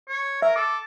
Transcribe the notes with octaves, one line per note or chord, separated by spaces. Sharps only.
C#5
A#4 E5
A4 D6